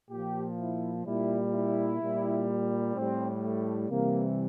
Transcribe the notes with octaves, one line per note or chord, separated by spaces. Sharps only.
A#2 F3 G4
E4
A#2 G3 E4
E4
A#2 G3
A2 G3 C4
A3
C3 E3 G3 A#3